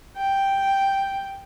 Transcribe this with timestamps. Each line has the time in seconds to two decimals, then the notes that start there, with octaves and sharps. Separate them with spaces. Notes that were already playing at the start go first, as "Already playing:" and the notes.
0.17 G5